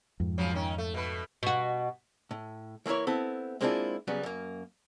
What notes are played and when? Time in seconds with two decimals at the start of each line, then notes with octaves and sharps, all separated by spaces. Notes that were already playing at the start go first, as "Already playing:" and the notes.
0.20 F2 G#2
0.38 C#3 F3 F#3
0.53 D#3 C#4
0.78 A3
0.94 B2 A3 B4
1.43 B2 F#4
2.31 A2
2.86 E3 A#3 E4 A#4 C#5
3.07 B3 C4 E4 A4
3.61 G#3 A#3 C4 D4 E4 F4
4.07 C#3 F#3 G3 B3
4.23 F#2 A#3